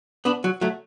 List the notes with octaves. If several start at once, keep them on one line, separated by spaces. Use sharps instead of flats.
B3 D4
F#3
F#3 A3